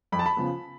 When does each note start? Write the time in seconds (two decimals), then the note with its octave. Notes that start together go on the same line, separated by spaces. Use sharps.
0.12 F2 B5
0.19 A5
0.26 B5
0.37 C#3 F3 B3